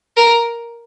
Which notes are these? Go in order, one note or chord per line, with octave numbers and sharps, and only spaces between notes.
A#4